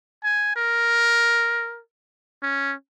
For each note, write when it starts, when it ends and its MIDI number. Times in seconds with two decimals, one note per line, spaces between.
0.24 0.51 80
0.56 1.81 70
2.43 2.74 61